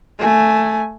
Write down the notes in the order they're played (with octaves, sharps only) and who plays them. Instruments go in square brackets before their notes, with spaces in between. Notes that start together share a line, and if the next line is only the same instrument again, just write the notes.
[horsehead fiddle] A3 G#5